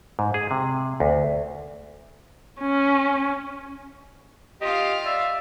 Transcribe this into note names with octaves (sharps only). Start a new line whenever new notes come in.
G#2
G#4
C3
D2
C#4
F4 G4 D#5 F5
D5 E5